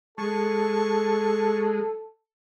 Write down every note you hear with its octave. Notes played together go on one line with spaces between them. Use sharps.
G#3 A4 A5 C#6